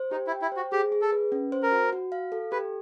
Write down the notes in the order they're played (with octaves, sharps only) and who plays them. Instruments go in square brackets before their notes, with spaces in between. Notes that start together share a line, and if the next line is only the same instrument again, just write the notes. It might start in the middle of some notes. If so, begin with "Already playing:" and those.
Already playing: [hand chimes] C5
[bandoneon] D#4 [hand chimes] G4
[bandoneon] E4
[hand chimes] G5
[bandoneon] E4
[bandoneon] F#4 [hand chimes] C5
[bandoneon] G4 [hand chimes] G#4
[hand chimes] G#4
[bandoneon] A4
[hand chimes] B4
C#4
C5
[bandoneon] A#4
[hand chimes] F#4
F#4
F5
A4
[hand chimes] G4 [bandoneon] B4